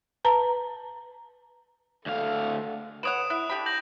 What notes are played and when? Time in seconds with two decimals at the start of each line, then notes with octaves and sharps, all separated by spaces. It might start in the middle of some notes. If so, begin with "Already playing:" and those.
0.25 B4 A5 A#5
2.06 D2 A4 F5
3.03 B4 C#5 F#5 D#6 D7 E7
3.30 E4 F#6
3.50 D3 G4 B5
3.66 G6 A#6 F#7